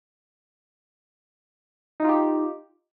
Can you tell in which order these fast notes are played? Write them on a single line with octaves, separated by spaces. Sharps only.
D#4 F4 G4